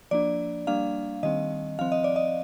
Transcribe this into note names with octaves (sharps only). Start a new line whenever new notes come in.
F3 A#3 D4 D5
G3 A#3 D4 F5
D#3 G3 C4 D#5
F3 C4 F5
D#5
D5
D#5